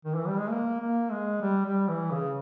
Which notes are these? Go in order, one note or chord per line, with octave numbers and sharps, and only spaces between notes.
D#3
E3
G3
G#3
A#3
A#3
G#3
G3
G3
E3
C#3